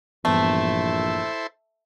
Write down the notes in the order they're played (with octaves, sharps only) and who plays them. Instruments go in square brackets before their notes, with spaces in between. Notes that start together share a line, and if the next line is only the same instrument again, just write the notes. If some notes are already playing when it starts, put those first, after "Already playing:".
[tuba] A#1 [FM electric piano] G2 E3 B3 [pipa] A3 [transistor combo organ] E4 A4 C5